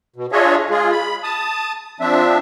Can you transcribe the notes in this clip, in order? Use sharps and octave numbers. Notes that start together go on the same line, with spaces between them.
B2
D4 F4 G#4 C#5 D#5 E5
G#3 F4 G#4
B5
A5 D#6
F3 C4 D4 E5